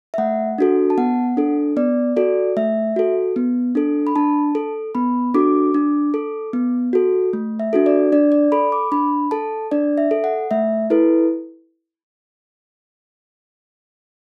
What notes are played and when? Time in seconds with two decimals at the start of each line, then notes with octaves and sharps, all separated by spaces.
0.14 E5
0.18 A3 F#5
0.58 D4 F#4 A4
0.90 A5
0.98 B3 F#5
1.37 D4 A4
1.77 B3 D5
2.16 F#4 A4 D5
2.57 A3 E5
2.96 F#4 A4
3.36 B3
3.75 D4 A4
4.07 B5
4.16 D4 A5
4.55 A4
4.95 B3 B5
5.34 D4 F#4 A4 D6
5.74 D4
6.14 A4
6.53 B3
6.93 F#4 A4
7.33 A3
7.60 E5
7.73 D4 F#4 A4
7.86 D5
8.12 D4 D5
8.32 D5
8.52 A4 B5
8.72 D6
8.92 D4 B5
9.31 A4 A5
9.71 D4 D5
9.98 E5
10.11 A4
10.24 F#5
10.51 A3 E5
10.90 E4 A4 B4